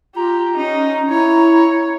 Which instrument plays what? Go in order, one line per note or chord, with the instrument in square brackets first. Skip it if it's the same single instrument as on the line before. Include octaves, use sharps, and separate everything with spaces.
[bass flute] F4 [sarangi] G4 [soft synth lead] A#5
[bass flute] C#4 [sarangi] D#4
[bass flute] E4 [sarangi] C#5